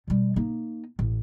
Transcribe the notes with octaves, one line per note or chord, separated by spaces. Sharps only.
B2 G3
A#3 D#4
A1